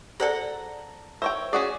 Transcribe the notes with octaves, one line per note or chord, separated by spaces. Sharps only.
G#4 A4 C5 D5 F#5 A#5
A#4 C5 C#5 E5 G5 E6
C#4 F#4 G#4 D5